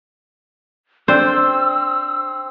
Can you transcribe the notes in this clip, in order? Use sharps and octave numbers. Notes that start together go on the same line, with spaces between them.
C4 D4 C5 E6